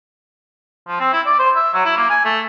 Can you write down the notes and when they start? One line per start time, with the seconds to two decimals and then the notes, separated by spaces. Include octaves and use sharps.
0.88 F3
1.00 C4
1.13 E4
1.26 D5
1.39 C5
1.55 E5
1.74 F#3
1.85 E4
1.97 A#3
2.10 G#5
2.25 A3